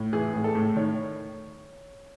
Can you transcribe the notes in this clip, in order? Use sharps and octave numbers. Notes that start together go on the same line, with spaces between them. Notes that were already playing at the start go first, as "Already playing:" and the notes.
Already playing: A2
E3 G#4
A2
A4
A2
D#3 C#5